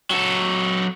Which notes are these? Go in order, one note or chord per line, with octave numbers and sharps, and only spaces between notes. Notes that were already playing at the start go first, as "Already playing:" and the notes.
F#3 A4